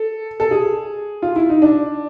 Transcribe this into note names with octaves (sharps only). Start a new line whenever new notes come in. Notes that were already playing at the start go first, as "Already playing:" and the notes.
Already playing: A4
A4
G#4
F4
E4
D#4
D4